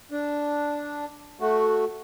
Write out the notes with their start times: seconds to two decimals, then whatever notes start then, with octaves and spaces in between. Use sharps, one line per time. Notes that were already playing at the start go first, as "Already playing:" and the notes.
0.12 D4
1.41 A3 F#4